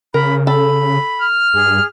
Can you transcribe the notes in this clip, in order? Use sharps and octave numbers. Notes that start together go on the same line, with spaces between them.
C#3 A#4 B5
A4 B5
F6
G2 G#4